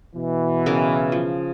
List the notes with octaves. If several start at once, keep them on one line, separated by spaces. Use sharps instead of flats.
B2 E3
C#3 A#4
F3